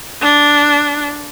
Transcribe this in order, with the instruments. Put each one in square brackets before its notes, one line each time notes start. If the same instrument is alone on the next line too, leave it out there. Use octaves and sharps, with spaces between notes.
[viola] D4